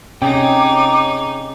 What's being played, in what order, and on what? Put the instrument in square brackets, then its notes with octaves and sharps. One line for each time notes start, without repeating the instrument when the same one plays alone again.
[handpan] C3 C#4 D#5 [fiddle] D#4 [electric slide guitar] G#4 C#5 G5 [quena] D6